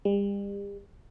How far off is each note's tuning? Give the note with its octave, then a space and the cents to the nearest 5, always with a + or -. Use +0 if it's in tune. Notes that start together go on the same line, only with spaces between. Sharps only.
G3 +40